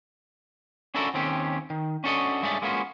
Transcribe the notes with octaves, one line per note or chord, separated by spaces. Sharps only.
C#4 D4 E4 F#4 A4 A#4
D#2 D#3 C4 C#4 G4
D#3
C#4 D4 F#4 A4 C#5 D#5
G2 G#3 A3 C#4 B4 D5
G#3 A#3 B3 C#4 F4 F#4